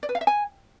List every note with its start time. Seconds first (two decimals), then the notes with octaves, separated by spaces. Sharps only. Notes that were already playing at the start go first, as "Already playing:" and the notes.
0.03 D5
0.09 B4
0.15 F5
0.21 E5
0.27 G#5